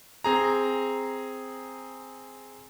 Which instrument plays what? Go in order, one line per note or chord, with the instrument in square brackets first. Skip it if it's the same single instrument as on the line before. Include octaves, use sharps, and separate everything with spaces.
[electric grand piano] C4 G#4 A#5